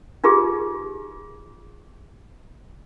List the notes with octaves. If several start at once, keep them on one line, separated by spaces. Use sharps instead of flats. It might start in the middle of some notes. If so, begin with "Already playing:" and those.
D#4 F4 G4 G#4